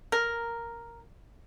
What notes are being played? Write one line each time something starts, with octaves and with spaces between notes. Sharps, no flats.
A#4